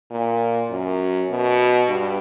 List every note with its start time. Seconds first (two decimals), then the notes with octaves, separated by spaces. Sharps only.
0.11 A#2
0.70 F#2
1.30 B2
1.89 G2